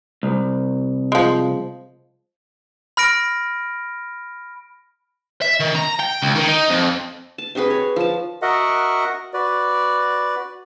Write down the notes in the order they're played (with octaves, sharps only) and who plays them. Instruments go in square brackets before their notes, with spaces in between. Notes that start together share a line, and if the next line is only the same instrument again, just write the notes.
[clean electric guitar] C2
[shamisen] F3 G#3
[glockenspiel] B5 F6 A#6 D7
[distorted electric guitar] E5
D#3
A#5
G5
C#2
D#3
D#4
F2
[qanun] A5
C3 F#4 G#4 B4
C#5
F3 A5
[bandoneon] F#4 A#4 D#5 E5 F#5
F#4 B4 D5